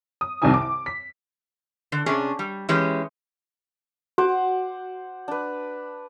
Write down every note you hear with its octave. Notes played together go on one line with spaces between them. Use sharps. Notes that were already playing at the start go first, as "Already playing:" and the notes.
D#6
C2 F2 C3 D#3 G#5 D#6
D6
B6
D3
C3 C#4 D4 G#4
G3
E3 G#3 C#4 G4
F#4 C5 F#5 D6
D4 B4